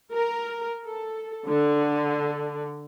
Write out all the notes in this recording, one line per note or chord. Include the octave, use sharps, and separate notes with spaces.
A#4
A4
D3